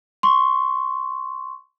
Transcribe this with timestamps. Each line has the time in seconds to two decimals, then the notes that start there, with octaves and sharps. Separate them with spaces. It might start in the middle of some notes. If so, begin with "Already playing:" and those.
0.23 C6 C#6